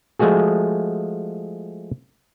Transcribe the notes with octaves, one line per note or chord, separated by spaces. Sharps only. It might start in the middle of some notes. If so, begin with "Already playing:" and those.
F3 G#3 A3 F#4 G#4